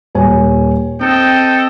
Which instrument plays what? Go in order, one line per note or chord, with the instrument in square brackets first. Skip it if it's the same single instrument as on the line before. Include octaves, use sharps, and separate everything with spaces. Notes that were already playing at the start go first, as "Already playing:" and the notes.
[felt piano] D#1 C#5 G#5
[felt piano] C4 [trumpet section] A4 D#5 G5